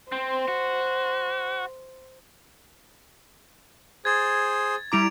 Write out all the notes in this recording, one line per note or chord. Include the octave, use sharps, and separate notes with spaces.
C4 C5
F#4
G#4 C5 G#6 A6
G3 E4 A#5 D6 D7 F7